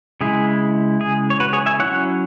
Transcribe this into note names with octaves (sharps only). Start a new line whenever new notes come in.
C#3 G#3 E4 G#4
G#4
C#5
F#4 B4
G#4 C#5
E5 G#5
F#3 C#4 E4 C#5 F#5